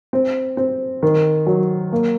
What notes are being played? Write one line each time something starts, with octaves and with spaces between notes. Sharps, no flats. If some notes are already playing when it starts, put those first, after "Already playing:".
C4
C4
D#3
F#3
A#3